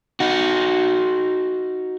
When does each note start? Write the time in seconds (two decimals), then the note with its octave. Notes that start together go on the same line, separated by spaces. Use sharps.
0.20 D#4 F#4